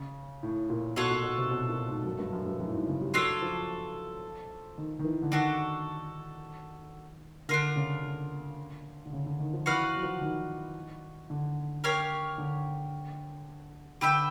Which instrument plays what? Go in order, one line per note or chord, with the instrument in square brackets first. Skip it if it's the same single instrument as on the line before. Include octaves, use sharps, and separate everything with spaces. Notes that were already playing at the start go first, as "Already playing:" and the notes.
Already playing: [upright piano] C#3
A2
A#2
[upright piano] B2 [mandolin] F4 A4 C#5 F#5
[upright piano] A#2
B2
C3
B2
A#2
G#2
F#2
G2
F#2
G2
F#2
A2
G#2
C#3
G3
[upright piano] F#3 [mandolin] D4 F4 A4 C#5
[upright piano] F3
D#3
D#3
E3
D3
[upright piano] D#3 [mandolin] D4 F#4 A4
[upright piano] D3 [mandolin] D4 F4 A#4
[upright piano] C#3
D3
D3
C#3
D3
D#3
F3
[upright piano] E3 [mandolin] F#4 B4 D5 F5
[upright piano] F#3
F3
D#3
D3
[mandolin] G4 A#4 C#5 F5
[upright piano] D3
[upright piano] D3 [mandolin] G4 B4 E5 G5